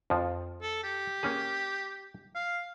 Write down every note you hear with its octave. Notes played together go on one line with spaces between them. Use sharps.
F2 F3
A4
G4
A#3 C#4 G#4
F5